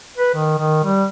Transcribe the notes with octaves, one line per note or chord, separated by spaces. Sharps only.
B4
D#3
D#3
G3